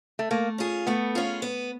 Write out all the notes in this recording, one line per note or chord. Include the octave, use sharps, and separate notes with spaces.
A3
A3 A#3
C#4 F4 G#4
A3 B3
C#4 F4 G#4
B3